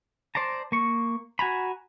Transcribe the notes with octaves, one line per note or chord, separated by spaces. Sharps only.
C5 D5 A5 A#5
A#3 C#6
F#4 G#5 A#5 B5